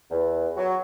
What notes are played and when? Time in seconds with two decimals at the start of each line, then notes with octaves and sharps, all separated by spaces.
0.11 E2
0.57 F#3